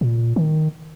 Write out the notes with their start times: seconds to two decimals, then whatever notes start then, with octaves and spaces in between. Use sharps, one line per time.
0.01 A#2
0.36 D#3